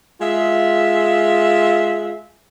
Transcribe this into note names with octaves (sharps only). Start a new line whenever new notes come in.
G#3 F4 G#4 E5